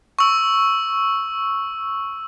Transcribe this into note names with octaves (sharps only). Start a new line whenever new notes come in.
C#6 E6